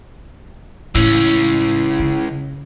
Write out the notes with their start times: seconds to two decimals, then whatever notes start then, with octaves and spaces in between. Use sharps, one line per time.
0.95 C#2 A2 E3 C#4 E4
2.00 C#3